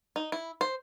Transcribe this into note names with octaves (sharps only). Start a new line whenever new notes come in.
D#4
E4
C5